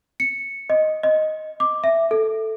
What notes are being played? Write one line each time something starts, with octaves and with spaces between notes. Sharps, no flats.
C#7
D#5
D#5
D6
E5
A4